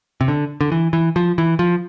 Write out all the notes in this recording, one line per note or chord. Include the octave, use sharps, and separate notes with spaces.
C3
D3
D3
E3
E3
F3
E3
F3